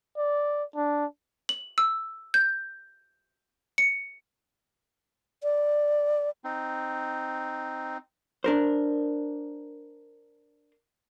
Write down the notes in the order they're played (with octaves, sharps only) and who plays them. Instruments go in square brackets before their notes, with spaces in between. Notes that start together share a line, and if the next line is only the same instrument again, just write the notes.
[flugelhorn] D5
D4
[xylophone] F#7
E6
G6
C#7
[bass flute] D5
[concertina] C4 D#4
[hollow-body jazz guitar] D4 A#4 C5